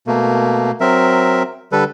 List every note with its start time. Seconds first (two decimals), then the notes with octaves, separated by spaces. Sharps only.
0.07 B2 A3 A#3
0.81 F#3 C4 A#4 E5
1.72 D3 G3 A4 B4